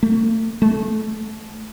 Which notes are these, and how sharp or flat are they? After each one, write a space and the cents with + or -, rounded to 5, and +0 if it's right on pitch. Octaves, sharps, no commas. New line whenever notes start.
A3 +30
A3 -25